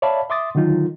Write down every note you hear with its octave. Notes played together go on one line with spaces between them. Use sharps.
C#5 D5 E5 F5 A5 B5
E5 C6 D6 D#6 A6
D3 D#3 F#3 D#4 F4